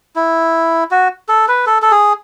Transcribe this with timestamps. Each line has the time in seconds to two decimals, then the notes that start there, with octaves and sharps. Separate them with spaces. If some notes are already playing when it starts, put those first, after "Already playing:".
0.16 E4
0.91 F#4
1.29 A4
1.48 B4
1.67 A4
1.82 A4
1.91 G#4